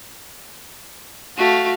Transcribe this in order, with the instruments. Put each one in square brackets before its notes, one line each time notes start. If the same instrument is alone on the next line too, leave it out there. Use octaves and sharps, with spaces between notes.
[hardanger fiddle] A3 [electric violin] F#4 F5